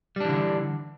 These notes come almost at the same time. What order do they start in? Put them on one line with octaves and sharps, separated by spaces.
G3 D4 E3 D3